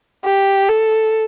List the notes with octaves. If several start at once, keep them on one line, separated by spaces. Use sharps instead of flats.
G4
A4